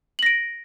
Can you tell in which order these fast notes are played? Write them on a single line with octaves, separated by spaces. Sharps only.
F#7 A#6 D7